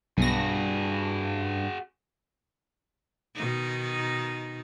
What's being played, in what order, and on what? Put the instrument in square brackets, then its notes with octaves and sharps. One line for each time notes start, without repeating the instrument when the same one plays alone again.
[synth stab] B1 B2 A#6 [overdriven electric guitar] G2 [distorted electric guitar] F#4 G#4
[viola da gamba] B2 D#3 D#4